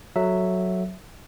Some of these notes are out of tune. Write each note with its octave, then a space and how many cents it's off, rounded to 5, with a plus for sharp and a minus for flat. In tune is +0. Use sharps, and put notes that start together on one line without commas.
F#3 +0 A4 +0 E5 +0